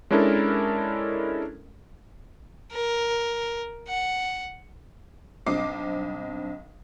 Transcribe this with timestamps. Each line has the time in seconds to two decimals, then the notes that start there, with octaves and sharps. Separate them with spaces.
0.10 G#3 C#4 D4 E4 A4 A#4
2.73 A#4
3.88 F#5
5.46 B1 G2 C4 D#5 D6 C7